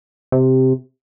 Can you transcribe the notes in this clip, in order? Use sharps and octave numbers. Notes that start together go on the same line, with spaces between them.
C3